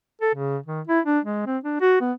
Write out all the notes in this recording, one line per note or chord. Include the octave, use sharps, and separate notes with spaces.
A4
C#3
D#3
E4
D4
G#3
C4
D4
F#4
B3